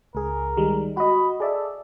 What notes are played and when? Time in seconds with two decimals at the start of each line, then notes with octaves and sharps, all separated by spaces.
0.15 C#2 G#4 A#4
0.57 D#3 G3 G#3
0.97 F#4 D#5 B5
1.40 G#4 A4 D5 E5